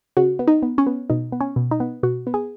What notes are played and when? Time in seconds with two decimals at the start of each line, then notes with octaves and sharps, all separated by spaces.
0.17 C#3 F#4
0.39 B3
0.48 D#4
0.63 B3
0.78 C#4
0.87 B3
1.10 B2 D#4
1.32 B3
1.41 C#4
1.56 B2
1.71 D#4
1.80 B3
2.03 B2 F#4
2.27 B3
2.34 G#4